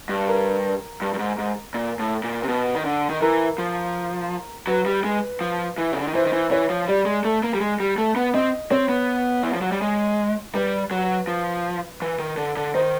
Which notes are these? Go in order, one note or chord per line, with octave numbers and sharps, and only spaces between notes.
G2
A#4
G2
G2
G#2
G#2
A#2
A2
A#2
C3
B2
D#3
D3
D#3
E3 A#4
F3
F#3 B4
G3
G#3
F3
E3
C#3
D3
D#3
E3 C5
D#3
E3
E3 C#5
F3
G3 D5
G#3
A3
A#3
G3
G#3
G3
A3
B3
C4 D#5
C4 C#5
B3
E3
F3
F#3
G3
G#3
G3 B4
F#3
F3
E3
D#3
D3
D3
D#3 C5